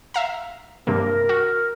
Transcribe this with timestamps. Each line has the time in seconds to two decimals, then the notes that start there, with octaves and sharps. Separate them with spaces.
0.14 E5 F5 A#5
0.87 G2 C3 A#3 A#4
1.29 F#4